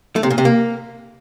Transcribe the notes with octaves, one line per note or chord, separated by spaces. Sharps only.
A3
C3
A#2
C3
A#3